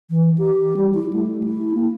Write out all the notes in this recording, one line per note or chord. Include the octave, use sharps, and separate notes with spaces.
E3
G4
G3
E4
A3
E4
A#3